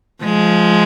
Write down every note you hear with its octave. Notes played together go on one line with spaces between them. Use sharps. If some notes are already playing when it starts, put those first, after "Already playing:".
F3 G#3